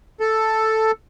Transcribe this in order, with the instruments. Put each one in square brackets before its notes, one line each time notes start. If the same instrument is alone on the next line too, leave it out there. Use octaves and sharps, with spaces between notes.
[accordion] A4